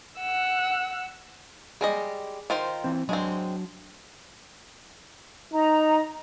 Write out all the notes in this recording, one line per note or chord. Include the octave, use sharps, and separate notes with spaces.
F#5 E6
G3 G#3 G#4 D5 D#5
D#3 F4 C5
E3 C4
F#3 G#3 C4 D4
D#4 A#5